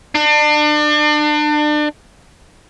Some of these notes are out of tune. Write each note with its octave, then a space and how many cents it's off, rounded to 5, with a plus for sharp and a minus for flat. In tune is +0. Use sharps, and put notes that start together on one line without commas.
D4 +35